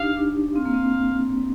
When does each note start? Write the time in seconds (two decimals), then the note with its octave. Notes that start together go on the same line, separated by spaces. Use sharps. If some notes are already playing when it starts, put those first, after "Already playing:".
Already playing: D4 D#4 G4 F5
0.17 D4
0.56 C4 F5
0.65 A#3
0.74 C4